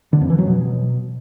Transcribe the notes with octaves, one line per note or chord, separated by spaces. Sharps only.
D3
F2
E3
F#3
B2